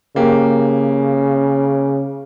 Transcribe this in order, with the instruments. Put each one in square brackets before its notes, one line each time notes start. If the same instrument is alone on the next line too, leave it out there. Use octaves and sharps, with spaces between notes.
[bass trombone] C#3 [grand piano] A#3 G4